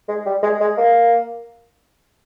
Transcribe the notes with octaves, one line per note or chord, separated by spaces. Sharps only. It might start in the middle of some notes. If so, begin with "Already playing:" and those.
G#3
G3
G#3
G#3
A#3